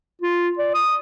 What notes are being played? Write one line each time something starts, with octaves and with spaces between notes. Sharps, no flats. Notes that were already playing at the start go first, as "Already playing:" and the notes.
F4
D5
D#6